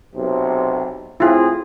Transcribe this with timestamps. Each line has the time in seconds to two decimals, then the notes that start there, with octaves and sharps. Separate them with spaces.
0.15 B1 C3
1.20 A2 C4 E4 F4 G#4